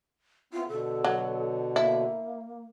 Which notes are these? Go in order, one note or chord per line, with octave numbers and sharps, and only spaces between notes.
B3 C4 E4 F4
B2 D3 A4
F#3
A#3 E4